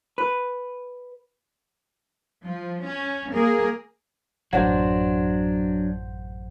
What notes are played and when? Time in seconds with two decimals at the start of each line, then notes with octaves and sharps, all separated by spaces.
0.18 B4
2.44 F3
2.86 C#4
3.32 A#3 G#4 A#4
4.53 A1 F#2 F#3 D4 C5 F#5